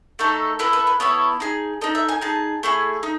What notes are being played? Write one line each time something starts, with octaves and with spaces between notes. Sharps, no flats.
A3 D#4 A4
B3 E4 A4 B4
B4
B4
B3 E4 A4 C#5
D#4 G#4
D#4 A4 D#5
E5
G#5
D#4 G#4 A5
A3 E4 G#4
D#4